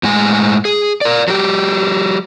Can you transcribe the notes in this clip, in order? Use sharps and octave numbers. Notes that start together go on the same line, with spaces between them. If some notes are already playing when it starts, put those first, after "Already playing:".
A2 G#3 G#5
G#4
A#4 D5
F#3 G4